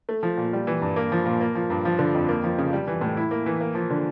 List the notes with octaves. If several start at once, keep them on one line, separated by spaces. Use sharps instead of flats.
A3
F3
A#2
G3
E3
G2
A#3
F3
A#2
A#3
F3
G2
F3
D3
F2
A#3
F3
C#3
G3
E3
A2
E4
A#3
E3
A#3
F3
D3